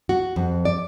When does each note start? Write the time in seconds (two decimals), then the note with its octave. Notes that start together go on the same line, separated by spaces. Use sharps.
0.09 F#4
0.36 F2
0.65 D5